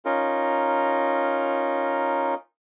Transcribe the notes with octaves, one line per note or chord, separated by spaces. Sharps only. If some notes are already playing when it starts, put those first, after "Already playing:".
C#4 D#4 F4 A#4